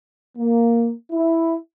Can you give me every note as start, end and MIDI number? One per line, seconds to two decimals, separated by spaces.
0.38 0.92 58
1.12 1.57 64